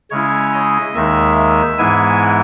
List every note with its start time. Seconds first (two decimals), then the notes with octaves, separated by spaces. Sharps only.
0.11 C#3 G#3 C#4 E4 C#5
0.53 D#5
0.95 D#2 D#3 G#3 D#4 E5
1.36 E5
1.78 G#2 E3 G#3 B3 E4 G#5